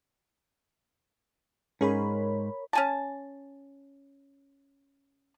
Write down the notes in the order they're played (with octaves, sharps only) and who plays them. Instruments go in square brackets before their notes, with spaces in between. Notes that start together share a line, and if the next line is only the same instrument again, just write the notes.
[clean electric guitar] G#2 [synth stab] C#4 G#4 [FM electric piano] A#4 C#5 B5
[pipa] C#4 G#5 A5